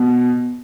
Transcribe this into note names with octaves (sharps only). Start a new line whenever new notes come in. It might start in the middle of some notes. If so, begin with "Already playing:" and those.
Already playing: B2